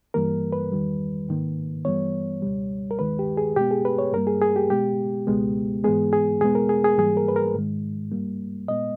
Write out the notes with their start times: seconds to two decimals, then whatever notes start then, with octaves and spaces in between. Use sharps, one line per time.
0.14 G2 E3 G3 A#3 A#4
0.53 B4
0.72 E2 D#3 G3
1.29 G#2 D#3 A#3
1.85 G2 E3 G3 B3 C#5
2.42 C#2 B2 G3
2.91 A#4
2.99 D#2 D#3 G#3 B4
3.19 G4
3.37 G#4
3.56 B2 G#3 B3 G4
3.71 G#4
3.85 B4
3.99 C#5
4.13 G2 G3 A#3 A#4
4.27 G#4
4.42 G#4
4.56 G4
4.70 B2 G#3 B3 G4
5.27 C#2 B2 G#3 B3
5.84 G#2 E3 G#3 B3 G#4
6.13 G#4
6.41 E2 B2 G#3 B3 G#4
6.55 A#4
6.69 G#4
6.84 G#4
6.98 G#2 E3 G3 A#3 G#4
7.17 A#4
7.28 B4
7.36 A#4
7.55 G#2 D#3 G#3
8.12 G2 G3 A#3
8.68 A#2 G#3 B3 D#5